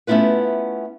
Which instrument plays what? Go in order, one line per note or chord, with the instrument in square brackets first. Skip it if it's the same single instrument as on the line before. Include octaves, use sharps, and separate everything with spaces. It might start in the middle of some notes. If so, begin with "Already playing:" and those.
[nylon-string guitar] A3 B3 C#4 E4 F4 B4